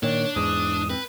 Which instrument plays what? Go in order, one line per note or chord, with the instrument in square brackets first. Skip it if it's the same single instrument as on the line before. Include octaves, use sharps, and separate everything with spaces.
[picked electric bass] A#2 D#3 [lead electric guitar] D4 [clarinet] C#5
[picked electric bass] E2 G#2 [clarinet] D#6
[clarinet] C4 [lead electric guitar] B4